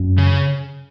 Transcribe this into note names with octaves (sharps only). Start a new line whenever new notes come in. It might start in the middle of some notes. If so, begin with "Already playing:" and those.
Already playing: F#2
C#3